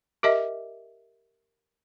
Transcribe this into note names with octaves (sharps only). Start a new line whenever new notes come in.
G4 A#4 D#5 E5